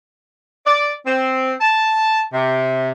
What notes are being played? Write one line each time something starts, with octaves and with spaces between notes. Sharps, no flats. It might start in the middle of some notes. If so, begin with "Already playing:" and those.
D5
C4
A5
C3